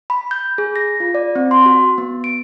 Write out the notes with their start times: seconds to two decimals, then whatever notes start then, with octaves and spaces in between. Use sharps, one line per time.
0.10 B5
0.31 G6
0.58 G#4
0.76 A#6
1.00 F4
1.14 D5
1.35 C4
1.51 C6
1.66 F#4
1.98 B3
2.24 D7